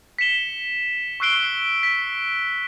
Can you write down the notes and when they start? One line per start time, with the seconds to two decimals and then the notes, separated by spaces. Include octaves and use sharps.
0.19 B6 C#7 E7 G7
1.20 C#6 E6 F#6 C7 D7 G7
1.83 B6